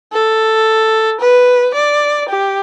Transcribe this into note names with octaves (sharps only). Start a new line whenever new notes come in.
A4
B4
D5
G4